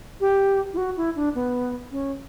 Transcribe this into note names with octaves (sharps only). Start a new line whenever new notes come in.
G4
E4
F#4
E4
D4
B3
C#4